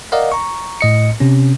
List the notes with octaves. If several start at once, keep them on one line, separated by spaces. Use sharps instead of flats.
A#4 D5 D#5 F5 F#5
A#5 C#6
A2 D#5 C#7
C3 C#4